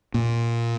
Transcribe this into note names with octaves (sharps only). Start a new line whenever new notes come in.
A#2